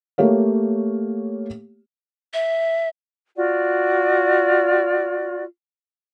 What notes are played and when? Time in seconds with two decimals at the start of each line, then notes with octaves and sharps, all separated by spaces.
0.18 A3 A#3 G4 C#5 F5
2.34 E5
3.36 F4 F#4 D5